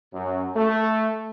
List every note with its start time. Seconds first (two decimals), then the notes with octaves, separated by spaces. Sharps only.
0.14 F#2
0.57 A3